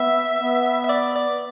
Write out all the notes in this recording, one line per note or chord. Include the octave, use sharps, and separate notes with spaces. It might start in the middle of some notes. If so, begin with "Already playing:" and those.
Already playing: B3 E5
B3
E5
D5
D5